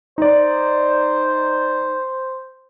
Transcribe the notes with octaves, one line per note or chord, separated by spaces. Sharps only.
D#4 C5 D5